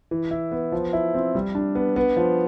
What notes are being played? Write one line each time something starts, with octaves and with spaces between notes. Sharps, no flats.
E3
E4
B3
F3
E4
C4
G3
D4
B3
B3
F3